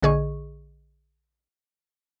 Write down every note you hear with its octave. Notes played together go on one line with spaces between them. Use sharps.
A#1 D3 G#4 D#5 C#6